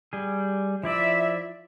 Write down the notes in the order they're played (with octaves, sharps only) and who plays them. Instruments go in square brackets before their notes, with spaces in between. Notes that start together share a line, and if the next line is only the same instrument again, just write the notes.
[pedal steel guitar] G3 G#4
[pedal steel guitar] F3 E4 D5 [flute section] E5